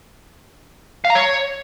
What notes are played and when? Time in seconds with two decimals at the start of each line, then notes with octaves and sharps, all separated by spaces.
1.05 F5
1.10 A#5
1.15 C#5